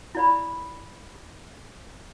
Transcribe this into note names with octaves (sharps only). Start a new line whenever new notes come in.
E4 D5 B5